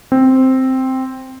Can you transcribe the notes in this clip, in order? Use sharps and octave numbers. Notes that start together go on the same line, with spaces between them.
C4